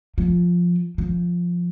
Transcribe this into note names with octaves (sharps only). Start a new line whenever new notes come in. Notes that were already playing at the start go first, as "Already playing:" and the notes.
F3
F3